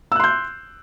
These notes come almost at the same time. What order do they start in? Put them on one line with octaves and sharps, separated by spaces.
E6 F#6 C6 G6